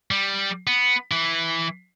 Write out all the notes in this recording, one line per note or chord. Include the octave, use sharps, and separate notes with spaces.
G3
B3
E3